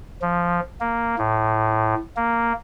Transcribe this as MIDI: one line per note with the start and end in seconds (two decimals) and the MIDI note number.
0.22 0.60 53
0.80 1.15 58
1.18 1.95 45
2.16 2.53 58